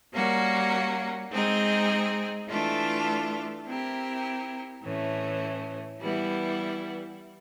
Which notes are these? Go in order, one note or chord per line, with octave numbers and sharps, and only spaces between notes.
G3 A#3 C#4 F#4 A#4
G#3 C4 D#4 G#4
E3 A3 D4 F4 A4
C4 E4 G4 A#4
A2 E3 A3 C#4
E3 G3 B3 E4